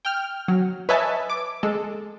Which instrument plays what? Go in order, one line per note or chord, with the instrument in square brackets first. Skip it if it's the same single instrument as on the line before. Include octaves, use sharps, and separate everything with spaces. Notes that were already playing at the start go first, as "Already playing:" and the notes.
[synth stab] G5 F6
F#3
B4 C#5 D#5 E5 G#5 A5
D6
G#3 A4